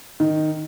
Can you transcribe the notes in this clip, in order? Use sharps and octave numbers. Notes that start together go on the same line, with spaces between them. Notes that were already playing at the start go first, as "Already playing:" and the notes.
D#3